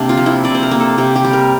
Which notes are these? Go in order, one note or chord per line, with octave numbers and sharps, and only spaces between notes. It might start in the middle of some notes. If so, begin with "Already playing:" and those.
Already playing: C3 A#3 D4
F4
F3
E4
C3 D5
C5
A#4
A#3
A4
C3 G4
G4
G3
A#4